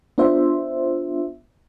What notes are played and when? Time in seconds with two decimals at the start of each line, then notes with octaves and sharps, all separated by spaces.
0.18 B3 D4 F4 C5 E5